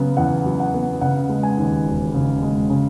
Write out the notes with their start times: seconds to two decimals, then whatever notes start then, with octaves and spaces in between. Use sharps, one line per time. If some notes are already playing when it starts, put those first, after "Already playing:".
Already playing: C#3 F#3 B3
0.17 E2 F#5
0.46 F#3
0.60 F#5
0.74 B3
1.01 C#3 F#5
1.29 G#3
1.43 G#5
1.58 D#2
1.86 E1
2.14 C#3
2.42 G#3
2.70 C#3